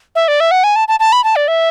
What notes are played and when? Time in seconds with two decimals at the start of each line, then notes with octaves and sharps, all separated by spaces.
0.15 E5
0.28 D5
0.40 E5
0.51 F#5
0.64 G#5
0.76 A5
0.88 A5
1.00 A5
1.12 B5
1.24 A5
1.36 D5
1.48 E5